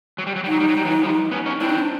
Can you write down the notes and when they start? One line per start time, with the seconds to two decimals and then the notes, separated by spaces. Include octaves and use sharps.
0.18 F#3
0.27 G3
0.36 F#3
0.44 G3
0.47 F#3 D#4
0.60 G3
0.68 F#3
0.77 G3
0.85 E3 F#3
1.03 F3 G3
1.31 B3 C#4
1.46 C#4 D#4
1.60 C4 D4 E4
1.69 D#4
1.79 D4